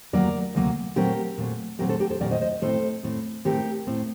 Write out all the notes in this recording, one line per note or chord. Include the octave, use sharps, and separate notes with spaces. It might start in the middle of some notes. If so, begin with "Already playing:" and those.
D2 C3 F#3 A#3 A#4 D5
D2 C3 F#3 A#3
A#2 F#3 A3 C4 G4 A#4
A#2 F#3 A3 C4
A#2 F#3 A3 C4 G4 A#4
A4 C5
G4 A#4
A4 C5
A#2 F#3 A3 C4 A#4 D5
C5 D#5
C5 D#5
A2 A3 C4 A4 C5
A2 A3 C4
A2 A3 C4 G4 A#4
A2 A3 C4